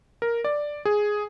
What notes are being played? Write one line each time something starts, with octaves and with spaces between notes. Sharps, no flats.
A#4
D5
G#4